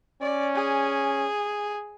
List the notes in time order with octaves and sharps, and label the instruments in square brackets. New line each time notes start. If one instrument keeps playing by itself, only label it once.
[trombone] C#4 [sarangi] D5
[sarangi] G#4